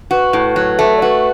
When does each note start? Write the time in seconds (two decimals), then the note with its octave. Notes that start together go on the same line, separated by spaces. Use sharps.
0.11 F#4 B4
0.33 A2
0.56 F#3
0.79 A3
0.96 D5
1.02 F#4 B4